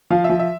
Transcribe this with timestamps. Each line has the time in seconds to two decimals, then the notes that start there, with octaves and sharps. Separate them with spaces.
0.10 F3 F5
0.24 E5
0.29 F3
0.39 E5